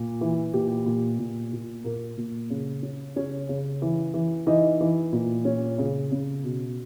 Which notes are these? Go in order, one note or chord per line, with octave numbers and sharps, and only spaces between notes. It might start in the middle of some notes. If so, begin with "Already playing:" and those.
Already playing: A#2
E3
A#2 G4
A#2
A#2
A#2
A#2 A#3 A#4
A#2
C#3
C#4
C#3 C#4 C#5
C#3
E3
E3
E3 D#4 D#5
E3
A#2
C#4
C#3
C#3
B2